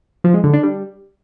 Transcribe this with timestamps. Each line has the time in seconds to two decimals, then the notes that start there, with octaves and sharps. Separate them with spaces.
0.24 F3
0.34 G#3
0.44 D3
0.54 D4
0.63 G3